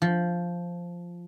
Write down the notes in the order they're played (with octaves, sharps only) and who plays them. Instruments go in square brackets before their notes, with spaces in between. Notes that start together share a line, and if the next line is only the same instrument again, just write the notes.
[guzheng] F3